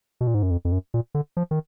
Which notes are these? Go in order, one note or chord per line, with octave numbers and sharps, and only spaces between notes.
B2
A#2
G#2
F#2
F2
F2
F#2
A#2
D3
F3
D#3